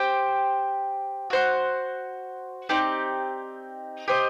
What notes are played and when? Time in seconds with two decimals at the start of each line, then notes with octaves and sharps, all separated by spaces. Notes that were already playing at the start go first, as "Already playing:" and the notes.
Already playing: G4 C5 G5
1.30 F#4 C5 F#5
2.69 C4 D#4 G4 D5
4.08 G4 C5 D#5